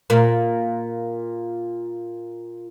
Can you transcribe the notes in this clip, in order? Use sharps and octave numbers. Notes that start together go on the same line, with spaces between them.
A#2 A#3